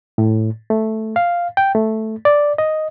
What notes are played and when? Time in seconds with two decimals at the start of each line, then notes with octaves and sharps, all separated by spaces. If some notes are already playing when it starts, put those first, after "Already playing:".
0.18 A2
0.70 A3
1.16 F5
1.57 G5
1.75 A3
2.25 D5
2.58 D#5